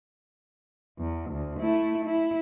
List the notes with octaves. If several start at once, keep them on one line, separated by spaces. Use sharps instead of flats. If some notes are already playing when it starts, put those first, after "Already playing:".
E2
D2
A3 E4
E4